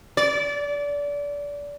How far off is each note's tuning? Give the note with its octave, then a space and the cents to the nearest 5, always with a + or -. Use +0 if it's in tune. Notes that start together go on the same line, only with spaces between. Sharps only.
D5 -25